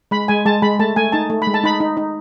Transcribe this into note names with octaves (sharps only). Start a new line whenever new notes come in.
G#3 B5
G#3 G#5
G#3 A5
G#3 B5
A3 A5
A3 G#5
D#4 A5
A3
B5
G#3
A5
D#4 B5
D#4
D#4